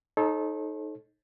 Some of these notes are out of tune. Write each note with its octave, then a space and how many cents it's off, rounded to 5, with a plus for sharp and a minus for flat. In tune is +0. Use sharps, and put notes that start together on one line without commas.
D#4 +0 A4 -25 C#5 -45